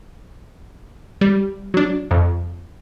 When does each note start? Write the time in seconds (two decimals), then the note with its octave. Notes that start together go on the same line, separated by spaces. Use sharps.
1.21 G3
1.74 F#3 D4
2.11 F2